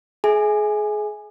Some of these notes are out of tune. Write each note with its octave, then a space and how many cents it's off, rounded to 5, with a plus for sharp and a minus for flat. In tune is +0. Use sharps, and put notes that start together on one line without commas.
G#4 +30 E5 -25 G#5 +0